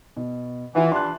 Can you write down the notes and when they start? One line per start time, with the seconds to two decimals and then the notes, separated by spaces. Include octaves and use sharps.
0.17 B2
0.75 E3 F4 F#5
0.92 G3 D4 C6 F#6